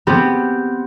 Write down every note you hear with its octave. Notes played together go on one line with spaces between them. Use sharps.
B3 C4 G4